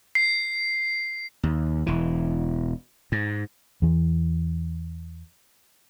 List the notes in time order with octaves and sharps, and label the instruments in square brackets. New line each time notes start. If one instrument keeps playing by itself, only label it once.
[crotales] C7
[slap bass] D#2
E1 E3
G#2
[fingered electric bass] E2 E3